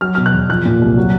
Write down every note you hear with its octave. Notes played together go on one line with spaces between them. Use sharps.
F#3 F6
B2 F6
F#6
E2
F3 F#6
A#2
C2
F#3